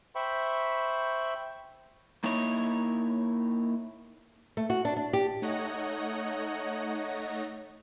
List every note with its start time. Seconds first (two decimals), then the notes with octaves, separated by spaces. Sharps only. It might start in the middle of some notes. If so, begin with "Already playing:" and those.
0.15 C5 E5 G5 B5 C#6
2.24 A#3 D#4 E4 C#5
4.57 A3
4.70 F#4
4.85 D4
4.97 D4
5.13 G4
5.42 A3 D#4 C#5 D#5 F#5 A#6